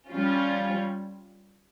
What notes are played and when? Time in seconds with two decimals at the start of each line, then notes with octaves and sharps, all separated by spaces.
0.11 G3 C#4 F4